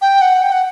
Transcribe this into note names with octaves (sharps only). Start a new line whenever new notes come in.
G5
F#5
G5
F#5